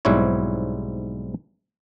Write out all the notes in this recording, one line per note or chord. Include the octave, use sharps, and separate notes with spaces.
B1 G#2 G3 C4 E4 C#5